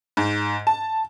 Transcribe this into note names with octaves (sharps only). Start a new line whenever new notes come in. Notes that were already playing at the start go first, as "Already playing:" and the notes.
G#2
A5